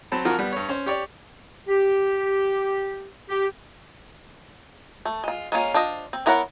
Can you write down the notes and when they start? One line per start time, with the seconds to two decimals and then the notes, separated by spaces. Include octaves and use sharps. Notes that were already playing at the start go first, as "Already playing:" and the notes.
0.12 F#3 C4 A5 B5
0.25 F2 F3 F4 F#4 A#4
0.39 G3 B3
0.52 G2 C#5
0.69 C#4 C5
0.86 G4 C#5 D5
1.68 G4
3.29 G4
5.05 A3
5.24 G#3 F4
5.52 G#3 A#3 C#4 F4
5.74 D4 F4 C5 D#5
6.13 C4
6.26 B3 E4 A#4 C#5 F#5